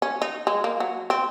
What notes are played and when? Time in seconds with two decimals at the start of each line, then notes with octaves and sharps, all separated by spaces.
0.02 C#4
0.22 D#4
0.47 G#3
0.64 A#3
0.80 F#3
1.10 C4